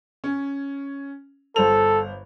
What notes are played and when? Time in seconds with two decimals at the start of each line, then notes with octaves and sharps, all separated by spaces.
0.24 C#4
1.56 G1 A4 C5 F7